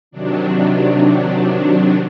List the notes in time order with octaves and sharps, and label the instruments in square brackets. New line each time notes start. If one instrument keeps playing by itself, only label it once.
[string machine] C3 D#3 F#3 D4